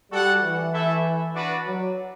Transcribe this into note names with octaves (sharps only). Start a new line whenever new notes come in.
G3 F#4 A4 D5 F#5
E3
A3 E4 A4 E5
D4 F#4 B4 D5
F#3